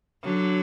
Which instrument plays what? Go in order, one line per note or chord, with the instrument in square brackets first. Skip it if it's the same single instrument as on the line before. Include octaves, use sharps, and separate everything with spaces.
[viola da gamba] D3 F#3